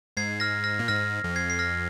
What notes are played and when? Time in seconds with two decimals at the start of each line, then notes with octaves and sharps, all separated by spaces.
0.17 G#2 G#6 C7
0.40 F6 A#6
0.64 F6 A#6
0.79 A#2
0.88 G#2 F6 A#6
1.24 F2
1.36 G#6 C7
1.50 C7
1.59 F6 A#6